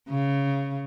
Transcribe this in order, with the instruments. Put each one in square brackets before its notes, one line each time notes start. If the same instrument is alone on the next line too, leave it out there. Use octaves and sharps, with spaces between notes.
[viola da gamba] C#3